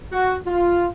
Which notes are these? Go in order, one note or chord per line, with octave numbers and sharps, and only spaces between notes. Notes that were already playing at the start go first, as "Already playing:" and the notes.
F#4
F4